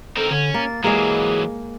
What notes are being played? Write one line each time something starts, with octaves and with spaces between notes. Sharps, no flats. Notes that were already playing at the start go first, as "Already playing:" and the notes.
C4 D#4 A4 A#4
D3 C#4
A#3 A6
E3 F#3 G#3 A#3 G#4